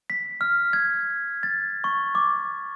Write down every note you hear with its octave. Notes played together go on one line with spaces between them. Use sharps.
B6
F6
G#6
A6
C#6
D6